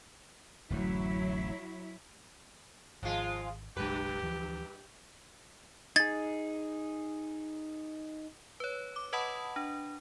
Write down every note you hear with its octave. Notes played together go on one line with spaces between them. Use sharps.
D1 A1 F#2 F#3 E4
G#1 F3 G#3 F4
F#1 B1 G2 G#3 G4 B4
D2 E3 F3
D#4 G#4 G#6 A6
B4 C#5
D6
B4 D#5 F#5 A5 B5 D#6
D4